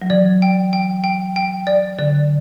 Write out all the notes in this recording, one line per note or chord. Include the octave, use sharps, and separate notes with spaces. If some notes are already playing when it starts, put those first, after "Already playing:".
F#3
E3 D5
G5
G5
G5
G5
D5
D3 D5